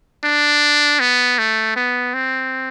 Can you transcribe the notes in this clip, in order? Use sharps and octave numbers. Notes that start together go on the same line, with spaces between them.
D4
B3
A3
B3
C4